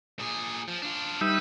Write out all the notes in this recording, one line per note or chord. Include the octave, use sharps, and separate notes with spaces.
A#2 G#4
F3
D4 F4
G3 D#4 B4 E5